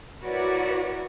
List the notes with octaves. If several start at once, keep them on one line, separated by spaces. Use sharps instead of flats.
E4 F#4 A#4 B4 C#5 D5